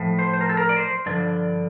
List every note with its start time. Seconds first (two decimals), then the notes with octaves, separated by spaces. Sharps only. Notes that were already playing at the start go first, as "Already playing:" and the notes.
Already playing: A2 F3
0.19 C5
0.33 C5
0.41 A#4
0.49 A4
0.57 A#4
0.69 D5
0.77 C5
1.06 G2 D3 F3 D5